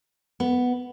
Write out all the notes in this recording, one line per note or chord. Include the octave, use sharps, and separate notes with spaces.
B3